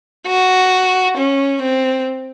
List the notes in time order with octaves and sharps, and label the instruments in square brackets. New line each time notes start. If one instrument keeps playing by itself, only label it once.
[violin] F#4
C#4
C4